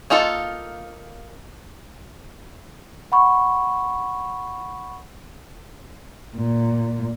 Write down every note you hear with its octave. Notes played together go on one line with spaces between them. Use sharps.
A#3 D#4 F4 A4
F#5 B5 C#6
A#2